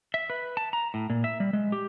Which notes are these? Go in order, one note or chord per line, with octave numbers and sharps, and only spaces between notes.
E5
B4
A5
A#5
A2
A#2
E5
G3
G#3
G4